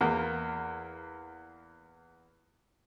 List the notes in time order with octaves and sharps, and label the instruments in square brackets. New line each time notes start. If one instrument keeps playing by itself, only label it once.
[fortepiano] E2 A#3